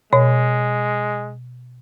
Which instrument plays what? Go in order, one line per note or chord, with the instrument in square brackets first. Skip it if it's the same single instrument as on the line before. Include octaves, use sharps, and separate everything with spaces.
[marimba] B2 C#5 [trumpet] G#3